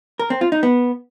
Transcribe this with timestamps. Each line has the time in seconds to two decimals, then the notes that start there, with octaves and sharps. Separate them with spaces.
0.19 A#4
0.30 C4
0.41 F4
0.52 D#4
0.63 B3